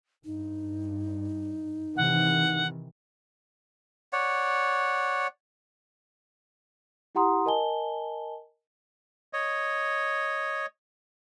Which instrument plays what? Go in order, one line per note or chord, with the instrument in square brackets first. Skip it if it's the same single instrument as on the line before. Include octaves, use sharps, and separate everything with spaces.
[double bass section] G2 [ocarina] D#4
[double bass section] C3 D#3 E3 [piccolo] F#5
[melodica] C#5 D5 F#5
[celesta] E4 G4 F#5 A#5 C6 D#6
A#4 D#5 G#5 A5 G7
[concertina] C#5 D#5